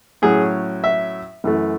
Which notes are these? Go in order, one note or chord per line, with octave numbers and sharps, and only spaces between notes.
A2 F#3 C#4 G#4
E5
F#2 E3 A3